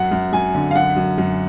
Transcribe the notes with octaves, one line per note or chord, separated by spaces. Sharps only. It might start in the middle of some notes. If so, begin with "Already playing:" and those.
Already playing: F#2 F#5
F#2
F#2 G#5
D3
F5
F#2 F#5
F#2
F#2